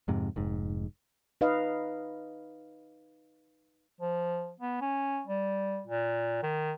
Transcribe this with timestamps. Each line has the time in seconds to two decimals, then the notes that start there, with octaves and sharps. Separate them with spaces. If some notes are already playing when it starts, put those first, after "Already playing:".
0.08 F2 G#2 C3
0.36 F1 G#2
1.41 D#4 B4 D#5 F5
4.00 F3
4.60 B3
4.81 C#4
5.27 G3
5.86 A#2
6.43 D#3